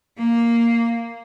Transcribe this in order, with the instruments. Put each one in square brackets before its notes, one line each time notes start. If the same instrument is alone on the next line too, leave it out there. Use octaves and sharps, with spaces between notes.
[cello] A#3